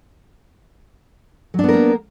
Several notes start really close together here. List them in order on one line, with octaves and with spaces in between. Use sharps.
F#3 D4 B3 A#4 A#3